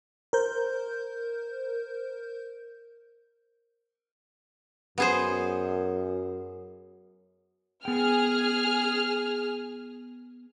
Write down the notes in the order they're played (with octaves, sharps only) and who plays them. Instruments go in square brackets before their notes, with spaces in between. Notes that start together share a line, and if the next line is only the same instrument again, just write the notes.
[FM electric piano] A#4 C5 G6
[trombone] F#2 [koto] B3 G#4 C5
[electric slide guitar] B3 G5 [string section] G#4 F6